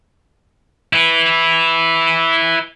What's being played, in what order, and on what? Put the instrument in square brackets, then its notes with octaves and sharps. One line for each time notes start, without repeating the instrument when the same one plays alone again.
[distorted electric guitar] E4 B4